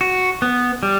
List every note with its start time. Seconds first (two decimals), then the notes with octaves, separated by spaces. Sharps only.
0.01 F#4
0.42 B3
0.83 G3